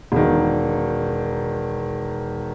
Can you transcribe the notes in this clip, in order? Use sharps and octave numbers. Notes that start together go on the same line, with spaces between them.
E1 D#3